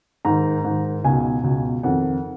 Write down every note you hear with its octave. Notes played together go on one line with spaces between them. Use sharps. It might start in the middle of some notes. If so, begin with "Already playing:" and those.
G#2 D#3 A#5
G#2 D#3
C#2 B2 G#5
C#2 B2
F2 D#3 F#5